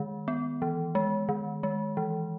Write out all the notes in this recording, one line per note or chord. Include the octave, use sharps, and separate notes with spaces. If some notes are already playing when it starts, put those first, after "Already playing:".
Already playing: D#3 G#3
B3
E3
G#3
D#3
G#3
E3